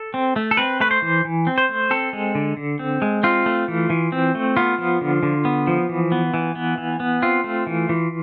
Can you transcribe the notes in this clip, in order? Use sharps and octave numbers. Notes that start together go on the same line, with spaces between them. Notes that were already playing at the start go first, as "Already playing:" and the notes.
Already playing: A4
C4
A3
A4
C4 B4
A3 B4
C5
E3
E3
C4
C5
A3
C4 A4
G#3
D3
D3
C4
G#3
C4 F4
A3
E3
E3
C4
A3
B3 F4
F3
D3
D3
B3
F3
E3
B3
E3
B3
E3
B3
C4 F4
A3
E3
E3